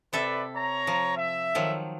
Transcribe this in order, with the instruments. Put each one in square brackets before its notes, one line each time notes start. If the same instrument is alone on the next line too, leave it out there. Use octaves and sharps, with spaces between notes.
[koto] C3 A4 E5 [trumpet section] B4 D5
[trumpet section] C#5 A#5
[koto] F3
[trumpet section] E5
[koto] D#3 F3 F#3